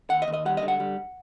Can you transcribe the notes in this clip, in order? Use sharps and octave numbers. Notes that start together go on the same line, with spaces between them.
D#2 F#5
D#5
D#2
D#5
G3 F#5
D#5
D3
F#5
G3